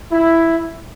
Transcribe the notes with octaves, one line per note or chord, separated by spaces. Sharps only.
E4